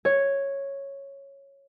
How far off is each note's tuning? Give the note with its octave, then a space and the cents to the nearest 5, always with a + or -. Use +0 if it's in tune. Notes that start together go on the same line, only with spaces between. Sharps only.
C#5 -5